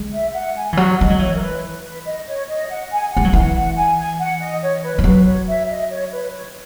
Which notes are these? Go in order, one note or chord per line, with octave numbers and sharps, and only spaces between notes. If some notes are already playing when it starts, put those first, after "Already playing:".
Already playing: G#3
E5
F#5
G#5
E3
F#3 F#5
G#3 D#5
F#3
E3 C#5
A#4
B4
B4
D#5
C#5
D#5
F#5
G#5
F#5
G#3
F#3
E3 F#5
F#5
G#5
G#5
F#5
D#5
C#5
B4
E3
F#3 B4
C#5
E5
D#5
C#5
B4
C#5